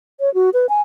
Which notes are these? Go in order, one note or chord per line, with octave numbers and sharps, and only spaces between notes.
C#5
F#4
B4
G#5